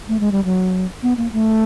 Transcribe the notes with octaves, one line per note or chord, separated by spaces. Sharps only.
A3
G#3
G3
F#3
B3
A#3
A3